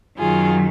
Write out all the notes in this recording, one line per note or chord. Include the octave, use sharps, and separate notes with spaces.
F#2 D#3 F#3 F4 G#4